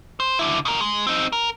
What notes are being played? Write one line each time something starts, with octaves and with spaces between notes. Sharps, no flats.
C5
D3 E4
B2 A#4
G#3
C4 D#4
A#4